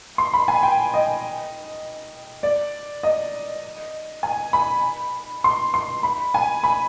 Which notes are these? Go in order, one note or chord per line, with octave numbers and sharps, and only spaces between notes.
C6
B5
G#5
G5
D#5
D5
D#5
G#5
B5
C6
C6
B5
G#5
B5